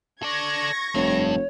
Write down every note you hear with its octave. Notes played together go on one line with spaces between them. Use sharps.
A4 D5 C#6 G#6 A#6
F1 G2 C#5